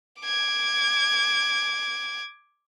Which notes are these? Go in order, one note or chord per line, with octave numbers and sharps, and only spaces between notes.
D6 G#6